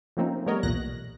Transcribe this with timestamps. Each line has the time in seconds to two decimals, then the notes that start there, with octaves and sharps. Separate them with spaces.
0.17 F3 A3 A#3 C4 C#4 D#4
0.46 G3 A3 B3 A#4 C#5 D#5
0.63 B1 E2 A#2 F#6 A#6